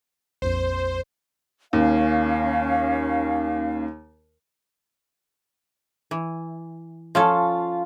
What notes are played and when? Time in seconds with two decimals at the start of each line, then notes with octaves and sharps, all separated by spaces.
0.42 A#1 F2 C5
1.73 D#2 C#4 F5
6.11 E3
7.15 F3 C#4 F4 A4